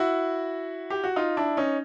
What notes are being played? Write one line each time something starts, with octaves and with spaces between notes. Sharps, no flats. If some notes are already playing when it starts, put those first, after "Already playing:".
Already playing: E4 F#4
G4
F#4
D#4 F4
D4 E4
C#4 D#4